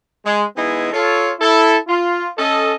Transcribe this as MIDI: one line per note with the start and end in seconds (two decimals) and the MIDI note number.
0.25 0.44 56
0.55 0.90 52
0.55 0.90 56
0.55 0.90 59
0.55 0.90 63
0.55 0.90 64
0.55 0.90 68
0.92 1.31 65
0.92 1.31 69
0.92 1.31 73
1.40 1.77 64
1.40 1.77 69
1.87 2.28 65
2.37 2.73 61
2.37 2.73 69
2.37 2.73 75